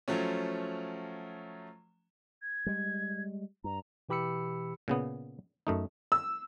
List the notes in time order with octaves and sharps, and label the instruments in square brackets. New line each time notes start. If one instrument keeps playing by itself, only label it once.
[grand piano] F3 F#3 A3 C#4
[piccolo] G#6
[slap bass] G3 G#3
[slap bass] G2 [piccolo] A#5
[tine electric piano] B2 E3 G4 B5 E6 C#7
[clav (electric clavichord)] A#2 C#3 B3
F#2 A3 D#4
[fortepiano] E6